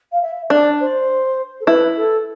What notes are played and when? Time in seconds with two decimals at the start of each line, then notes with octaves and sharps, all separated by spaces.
0.12 F5
0.21 E5
0.50 D4 D5
0.80 C5
1.60 A4
1.67 E4 B4
1.96 A4